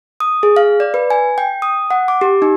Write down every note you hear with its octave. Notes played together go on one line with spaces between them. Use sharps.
D#6
G#4
F5
D5
B4
G#5
G5
D#6
F#5
D6
G4
D#4